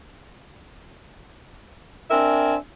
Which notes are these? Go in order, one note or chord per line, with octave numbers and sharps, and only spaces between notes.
C4 D4 A#4 E5 G#5